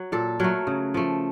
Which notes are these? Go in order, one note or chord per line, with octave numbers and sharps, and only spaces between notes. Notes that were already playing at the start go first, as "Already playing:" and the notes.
Already playing: F#3
A#2 A4
F#3 A3 A#4
C#3
F3 A3